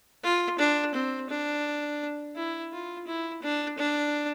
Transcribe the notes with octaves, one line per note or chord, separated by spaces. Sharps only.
F4
D4
C4
D4
E4
F4
E4
D4
D4